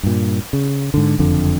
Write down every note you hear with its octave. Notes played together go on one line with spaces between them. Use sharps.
G2 A#2
C#3
G#2 D3
F#1 F2 D3